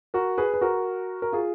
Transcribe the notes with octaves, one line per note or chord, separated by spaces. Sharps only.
F#4 A#4
G#4 B4
B4
F#4 A#4
A#4
F4 G#4